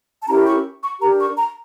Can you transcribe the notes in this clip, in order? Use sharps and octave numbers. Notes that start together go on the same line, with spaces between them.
A5
C#4 E4 G4 A#4 A#5
C#6
C#6
D4 G4 A#4 A#5
C#6
A#5